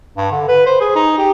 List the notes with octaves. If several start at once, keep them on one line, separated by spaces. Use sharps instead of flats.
G2
D3
B4
C5
G#4
D#4
G4